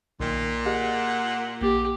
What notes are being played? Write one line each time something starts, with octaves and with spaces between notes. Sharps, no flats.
B1 A#2 D#3 G5
G4 G#4 D#5 F#5
A#1 A#3 G4 A6